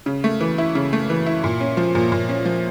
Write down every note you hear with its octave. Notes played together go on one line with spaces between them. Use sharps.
C#3
A3
E3
E4
C#3
A3
E3
E4
A#2
C#4
F3
A#2
A#2
C#4
F3